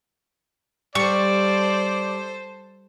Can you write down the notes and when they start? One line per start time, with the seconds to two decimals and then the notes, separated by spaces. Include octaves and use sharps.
0.95 G3 A4 C5 D5 C#6